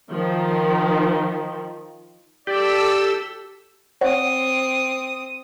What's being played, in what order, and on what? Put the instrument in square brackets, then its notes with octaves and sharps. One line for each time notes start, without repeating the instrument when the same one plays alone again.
[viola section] D#3 F3
[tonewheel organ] G4 [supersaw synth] A4 [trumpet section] D5 [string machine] E6
[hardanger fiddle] C4 D#6 [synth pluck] C5 C#5 F#5